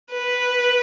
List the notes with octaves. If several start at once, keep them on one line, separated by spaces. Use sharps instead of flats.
B4